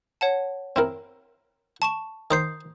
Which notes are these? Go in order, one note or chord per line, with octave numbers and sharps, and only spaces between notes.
C#5 F#5 A5
C4 E4 A#4
A5 C#6 E7
D#3 C5 D#6 G6 C7